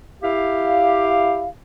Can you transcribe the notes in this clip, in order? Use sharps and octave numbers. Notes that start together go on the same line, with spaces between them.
E4 G4 F5